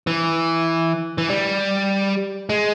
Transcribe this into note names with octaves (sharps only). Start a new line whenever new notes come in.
E3
E3
G3
G#3